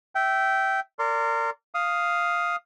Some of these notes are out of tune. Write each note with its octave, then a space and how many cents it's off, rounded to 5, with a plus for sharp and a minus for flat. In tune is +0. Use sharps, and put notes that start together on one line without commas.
E5 +0 G5 -20
A#4 -30 D5 -20 C6 +0
F5 +0 D#6 +0